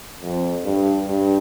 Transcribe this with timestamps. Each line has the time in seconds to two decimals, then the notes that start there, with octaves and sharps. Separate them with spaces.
0.22 F2
0.65 G2
1.07 G2